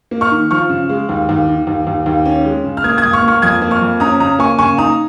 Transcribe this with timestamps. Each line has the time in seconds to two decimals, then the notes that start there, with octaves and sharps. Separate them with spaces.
0.11 A#3
0.21 C#6 F6
0.31 D#3
0.50 F3 C#6 F6
0.70 C#3
0.89 G#3
1.09 D#2
1.29 D#2
1.48 D#3
1.67 D#2
1.87 D#2
2.06 D#2
2.26 C#4
2.45 G#3
2.64 C#3
2.77 F6
2.84 A#3 D#6 G#6
2.98 D#6 G#6
3.03 C#2
3.13 C#6 F6
3.22 A#3
3.28 C#6 F6
3.42 F2 D#6 G#6
3.62 A#3
3.71 C#6 F6
3.81 F2
4.00 C#4 A#5 D#6
4.20 C#3 A#5 D#6
4.39 A#3 G#5 C#6
4.59 C#3 G#5 C#6
4.78 D#4 A#5 D#6